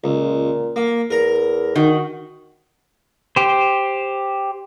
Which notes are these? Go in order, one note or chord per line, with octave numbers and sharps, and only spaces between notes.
C#2 A#2
A#3
E2 A#4 A#5
D#3 F#4
G4 C5